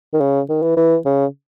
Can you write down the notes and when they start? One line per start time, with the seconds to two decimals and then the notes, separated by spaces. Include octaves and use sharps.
0.13 D#3
0.21 C#3
0.49 D#3
0.62 E3
0.77 E3
1.06 C#3